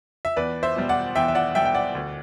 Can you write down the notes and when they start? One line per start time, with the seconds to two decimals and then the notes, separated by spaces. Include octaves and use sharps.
0.25 E5
0.36 E2 B4 D5
0.63 C5 E5
0.76 B2 G3
0.89 D5 F#5
1.15 E2 E5 G5
1.28 E5
1.35 D5 F#5
1.55 B2 G3 E5 G5
1.65 G5
1.75 D5 F#5
1.95 D2